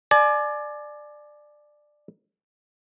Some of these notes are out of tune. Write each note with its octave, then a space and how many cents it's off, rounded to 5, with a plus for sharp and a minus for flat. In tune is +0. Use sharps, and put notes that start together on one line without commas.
D5 +15 G#5 +40